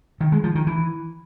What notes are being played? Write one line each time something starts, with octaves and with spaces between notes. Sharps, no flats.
D#3
G#3
F3
D#3
E3